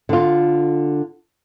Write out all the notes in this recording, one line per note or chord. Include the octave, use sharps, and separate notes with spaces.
D3 F4